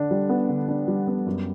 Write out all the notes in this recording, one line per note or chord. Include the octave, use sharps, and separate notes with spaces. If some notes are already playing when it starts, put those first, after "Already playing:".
Already playing: D3 D4
G3
B3
D3
D4
G3
B3
F#2